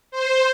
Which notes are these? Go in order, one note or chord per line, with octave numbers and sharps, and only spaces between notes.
C5